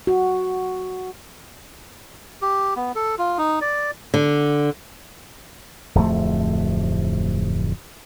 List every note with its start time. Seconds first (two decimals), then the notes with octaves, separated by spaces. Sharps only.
0.07 F#4
2.42 G4
2.76 B3
2.95 A4
3.18 F4
3.38 D#4
3.61 D5
4.14 D3
5.95 D1 F2 F3 A3